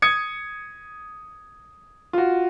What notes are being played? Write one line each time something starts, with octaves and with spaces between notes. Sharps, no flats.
D#6 G#6 C#7
F4 F#4